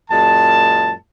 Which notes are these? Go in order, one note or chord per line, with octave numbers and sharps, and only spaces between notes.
F#2 A#2 G#3 A5